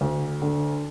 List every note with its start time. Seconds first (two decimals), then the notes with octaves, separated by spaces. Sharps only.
0.01 D2
0.42 D3